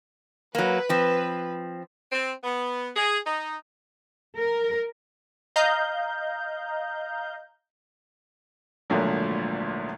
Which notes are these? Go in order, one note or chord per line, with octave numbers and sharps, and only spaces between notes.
F#3 A#3 B4
F3 C4
C4
B3
G#4
D#4
A#4
D#5 F5 A#5 G6
G#1 D2 A#2 D3 F3 F#3